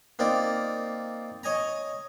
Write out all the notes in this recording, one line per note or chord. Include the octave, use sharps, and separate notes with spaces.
A#3 C4 D#4 F4 D5
C#5 D#5 G#5 A#5